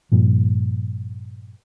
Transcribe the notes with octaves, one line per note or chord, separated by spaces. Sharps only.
G2 A#2 F3